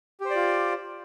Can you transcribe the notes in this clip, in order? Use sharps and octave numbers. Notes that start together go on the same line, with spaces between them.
F4 G4 C5 D5